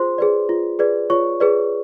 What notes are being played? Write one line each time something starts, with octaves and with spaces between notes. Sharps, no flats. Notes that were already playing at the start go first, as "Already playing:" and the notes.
Already playing: F4 G#4 C5 C6
G#4 B4 D5
F4
G#4 B4 D5
F4 C#5 C#6
G#4 B4 D5